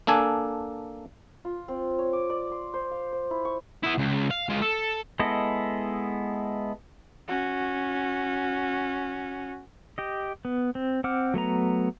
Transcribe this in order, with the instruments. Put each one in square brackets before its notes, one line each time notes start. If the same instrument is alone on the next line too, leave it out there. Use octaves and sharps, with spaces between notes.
[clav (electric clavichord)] A#3 D4 A4 G#5
[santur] F4
C4
C#5
D6
D5
C6
C5
F5
C5
E4
C#6
[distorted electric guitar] B3 E4
C#2
F5
G#3 F4
A4
[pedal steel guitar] G#3 B3 E4 A4 D#5
[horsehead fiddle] C#4 F#4
[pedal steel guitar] G4 D#5
B3
C4
C4 F#5 D6 F6
F#3 A3 B3 A#5